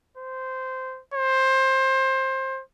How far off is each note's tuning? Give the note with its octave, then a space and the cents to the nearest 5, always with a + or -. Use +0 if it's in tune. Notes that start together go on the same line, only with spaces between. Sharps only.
C5 -10
C5 +20